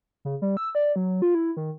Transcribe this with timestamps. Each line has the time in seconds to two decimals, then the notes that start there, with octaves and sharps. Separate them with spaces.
0.25 C#3
0.42 G3
0.57 E6
0.75 D5
0.96 F#3
1.22 F4
1.35 E4
1.57 D#3